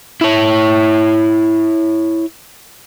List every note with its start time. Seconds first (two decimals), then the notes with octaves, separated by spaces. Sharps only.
0.21 E4 C#5